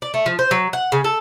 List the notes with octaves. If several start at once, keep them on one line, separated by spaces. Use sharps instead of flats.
D5
A3
F3
C5
F#3
F#5
C#3
A4